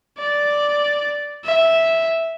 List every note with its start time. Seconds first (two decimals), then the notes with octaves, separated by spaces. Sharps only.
0.18 D5
1.45 E5